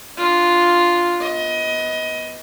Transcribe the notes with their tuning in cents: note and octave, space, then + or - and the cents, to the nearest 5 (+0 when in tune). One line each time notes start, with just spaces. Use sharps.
D4 +0 F4 +0
B3 +0 D#5 +25